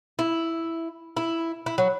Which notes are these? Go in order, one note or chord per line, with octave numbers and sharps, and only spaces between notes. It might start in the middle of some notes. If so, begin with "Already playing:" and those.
E4
E4
E4
F#3